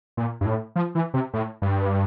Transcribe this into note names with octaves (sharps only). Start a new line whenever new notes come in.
A#2
G2
A2
F3
E3
C3
A2
G2